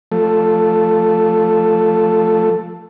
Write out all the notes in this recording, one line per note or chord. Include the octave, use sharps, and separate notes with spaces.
F3 A3 A4